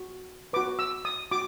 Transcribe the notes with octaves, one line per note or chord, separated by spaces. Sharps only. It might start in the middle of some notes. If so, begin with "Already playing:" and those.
Already playing: F#4
F#4 B4 D6
E6
D#6
F#4 D6